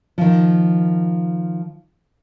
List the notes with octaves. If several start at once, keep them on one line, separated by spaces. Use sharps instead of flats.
D#3 F3